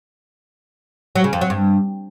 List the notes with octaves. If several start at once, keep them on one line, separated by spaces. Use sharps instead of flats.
F#3
C#3
F2
F#3
G2